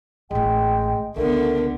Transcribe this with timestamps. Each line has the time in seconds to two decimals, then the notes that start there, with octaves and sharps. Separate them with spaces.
0.31 A1 A2 G#3 G5
1.17 C#2 D3 A3 B3 A#4